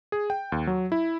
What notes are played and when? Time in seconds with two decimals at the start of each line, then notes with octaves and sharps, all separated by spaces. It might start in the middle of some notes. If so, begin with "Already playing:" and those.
0.12 G#4
0.30 G5
0.52 D#2
0.67 F#3
0.92 E4